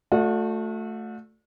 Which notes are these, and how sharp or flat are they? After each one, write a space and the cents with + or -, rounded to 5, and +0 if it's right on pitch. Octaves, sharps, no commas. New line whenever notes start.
A3 +0 F#4 -40 D5 +5